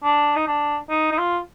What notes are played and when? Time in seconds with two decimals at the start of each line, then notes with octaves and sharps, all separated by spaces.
0.04 D4
0.36 D#4
0.47 D4
0.90 D#4
1.12 D#4
1.18 F4